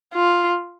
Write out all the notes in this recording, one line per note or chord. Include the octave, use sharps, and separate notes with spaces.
F4